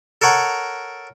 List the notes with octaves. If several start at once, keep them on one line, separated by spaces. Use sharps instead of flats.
A4 A#4 C#5 F#5 A#5